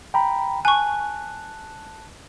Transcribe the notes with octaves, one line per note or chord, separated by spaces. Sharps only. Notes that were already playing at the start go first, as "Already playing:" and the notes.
G5 A#5 B5
G#5 A5 C#6 F#6